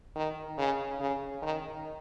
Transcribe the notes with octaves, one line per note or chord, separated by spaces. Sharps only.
D#3
C#3
C#3
D#3